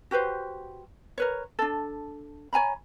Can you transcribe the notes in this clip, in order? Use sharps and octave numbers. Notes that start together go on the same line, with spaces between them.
F#4 G4 B4 C5
A#4 B4 C#5
D4 A4
C#5 G#5 A#5 B5